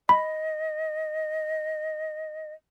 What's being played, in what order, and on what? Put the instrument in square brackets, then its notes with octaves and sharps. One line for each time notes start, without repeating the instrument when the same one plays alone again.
[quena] D#5 [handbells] B5